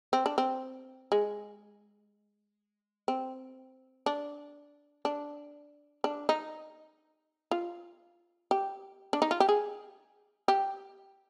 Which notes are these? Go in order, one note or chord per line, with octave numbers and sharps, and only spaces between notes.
C4
D4
C4
G#3
C4
D4
D4
D4
D#4
F4
G4
D4
D#4
F4
G4
G#4
G4